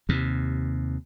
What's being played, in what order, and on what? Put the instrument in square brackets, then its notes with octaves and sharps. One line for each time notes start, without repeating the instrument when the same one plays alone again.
[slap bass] D#2 C3